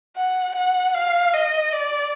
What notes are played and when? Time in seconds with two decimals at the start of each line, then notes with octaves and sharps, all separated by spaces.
0.16 F#5
0.55 F#5
0.94 F5
1.33 D#5
1.72 D5